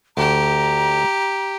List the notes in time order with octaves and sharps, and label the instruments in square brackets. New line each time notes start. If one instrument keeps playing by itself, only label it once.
[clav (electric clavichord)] D2 [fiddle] G4 [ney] A#5